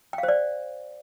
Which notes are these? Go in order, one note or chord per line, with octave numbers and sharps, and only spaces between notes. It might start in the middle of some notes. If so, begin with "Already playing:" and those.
G5
F5
C5
D5